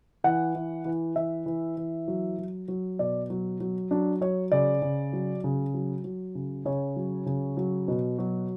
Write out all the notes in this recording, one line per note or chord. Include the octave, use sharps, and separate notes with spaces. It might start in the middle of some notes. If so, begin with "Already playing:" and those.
E3 F#5
E3
E3
E3 E5
E3
E3
F#3
F#3
F#3
B2 D5
F#3
F#3
F#3 D4
F#3 C#5
C#3 D5
C#3
F#3
C#3
F#3
F#3
C#3
C#3 C#5
F#3
C#3
F#3
B2
F#3